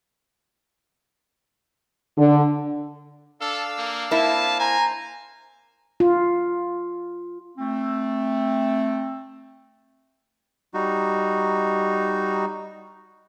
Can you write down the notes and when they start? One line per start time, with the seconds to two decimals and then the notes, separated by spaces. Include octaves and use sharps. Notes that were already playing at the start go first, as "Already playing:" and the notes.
2.17 D3
3.41 D4 A4 F5 E6
3.78 A#3
4.11 A#3 C4 E4 A5
4.60 C5 G#5 A#5
6.00 F4
7.58 A3 C4
10.74 G3 D#4 F#4